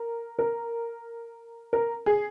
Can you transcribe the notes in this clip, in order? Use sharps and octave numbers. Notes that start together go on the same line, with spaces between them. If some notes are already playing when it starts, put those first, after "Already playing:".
Already playing: A#4
A#4
A#4
G#4